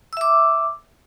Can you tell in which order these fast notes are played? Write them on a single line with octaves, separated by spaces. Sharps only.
E6 E5 D6